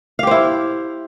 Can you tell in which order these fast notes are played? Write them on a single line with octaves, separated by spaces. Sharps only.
F5 G4 C5 E4